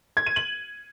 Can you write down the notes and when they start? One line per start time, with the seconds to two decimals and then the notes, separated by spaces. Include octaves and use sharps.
0.17 G#6
0.26 D#7
0.36 F#7